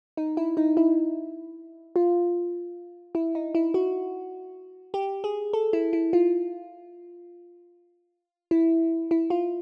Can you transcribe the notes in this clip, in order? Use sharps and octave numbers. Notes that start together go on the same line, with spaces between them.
D#4
E4
D#4
E4
F4
E4
D#4
E4
F#4
G4
G#4
A4
E4
E4
F4
E4
E4
F4